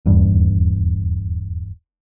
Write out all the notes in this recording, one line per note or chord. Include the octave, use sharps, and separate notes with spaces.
D#1 E2 G2